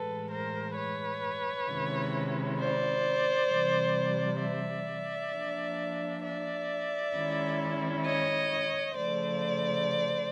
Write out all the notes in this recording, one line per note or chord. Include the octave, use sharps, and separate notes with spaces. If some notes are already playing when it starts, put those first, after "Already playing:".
Already playing: A2 E3 G#3 A4 B4
A#4 C5
B4 C#5
C3 D#3 G#3 C#4 E4
C5 D5
C3 E3 G3
D5 E5
F3 A#3 D4
D5 E5
D#3 G#3 C#4 E4
C#5 D#5
C#3 F3 A3 C5 D5